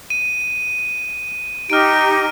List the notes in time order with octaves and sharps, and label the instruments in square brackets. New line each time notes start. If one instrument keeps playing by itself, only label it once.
[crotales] D#7
[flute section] D#4 G4 [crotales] F6 D7